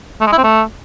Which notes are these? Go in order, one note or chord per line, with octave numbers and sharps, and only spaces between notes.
A3
G#3
E4
C4
A3